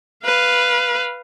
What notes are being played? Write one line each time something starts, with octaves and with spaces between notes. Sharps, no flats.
B4 F5